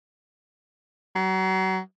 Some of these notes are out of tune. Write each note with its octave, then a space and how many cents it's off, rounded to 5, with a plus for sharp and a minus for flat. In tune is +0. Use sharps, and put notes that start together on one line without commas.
F#3 +35